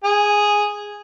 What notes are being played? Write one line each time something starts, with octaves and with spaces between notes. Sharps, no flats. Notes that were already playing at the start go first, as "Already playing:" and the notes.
G#4